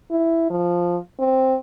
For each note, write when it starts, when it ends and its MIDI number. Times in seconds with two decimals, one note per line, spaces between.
0.11 0.45 64
0.50 0.97 53
1.20 1.57 60